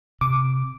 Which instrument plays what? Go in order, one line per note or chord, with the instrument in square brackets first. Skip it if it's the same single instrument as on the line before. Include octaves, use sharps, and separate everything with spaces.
[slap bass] C3 [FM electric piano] D6